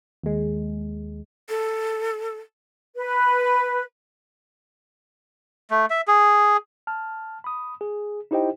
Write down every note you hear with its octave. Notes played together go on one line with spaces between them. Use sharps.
D#2 G#3
A4
B4
A3
E5
G#4
A5 F6
B5 D#6
G#4
D#4 E4 G4 C5 D#5 G5